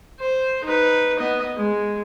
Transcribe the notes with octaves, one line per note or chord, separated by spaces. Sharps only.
C5
D#4 B4
B3 D#5
G#3